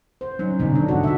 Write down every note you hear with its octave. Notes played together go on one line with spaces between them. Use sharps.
C5
F#3 C#4 D#4
B2 D3 D#3 G3 C#4 D#4
F#3 D4
G#2 B2 F#4
F#4 E5